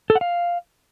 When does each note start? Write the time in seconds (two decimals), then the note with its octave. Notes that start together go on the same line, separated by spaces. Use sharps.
0.10 A4
0.15 F#5
0.21 F5